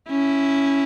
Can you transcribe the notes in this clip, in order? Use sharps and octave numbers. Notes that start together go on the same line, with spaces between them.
C#4 E4